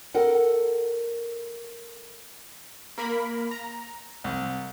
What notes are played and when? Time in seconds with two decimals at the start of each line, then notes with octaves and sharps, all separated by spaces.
0.15 A4 A#4 F#5
2.98 A#3 A#4 B5
3.51 A#5
4.24 C2